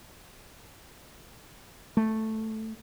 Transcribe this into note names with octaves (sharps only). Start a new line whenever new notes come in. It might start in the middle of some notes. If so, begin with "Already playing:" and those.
A3